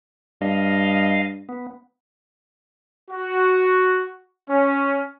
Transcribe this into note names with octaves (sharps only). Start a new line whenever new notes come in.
G2 D#5 F5
B3
F#4
C#4